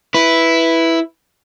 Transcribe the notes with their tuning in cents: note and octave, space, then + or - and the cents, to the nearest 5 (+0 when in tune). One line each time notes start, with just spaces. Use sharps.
E4 +0 B4 +0